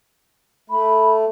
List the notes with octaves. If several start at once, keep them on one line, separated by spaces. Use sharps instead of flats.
A3 B5